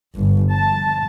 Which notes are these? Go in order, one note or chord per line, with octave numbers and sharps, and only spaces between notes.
G1
A5